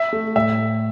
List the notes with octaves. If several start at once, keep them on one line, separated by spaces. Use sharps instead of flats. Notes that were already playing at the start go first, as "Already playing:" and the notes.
Already playing: E5
A3
A2 E5